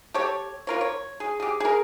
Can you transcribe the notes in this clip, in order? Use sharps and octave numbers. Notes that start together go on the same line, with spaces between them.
G4 A4 C#5
F4 A#4 C#5
C#5
G#4
G4 G#4
G#4 A#4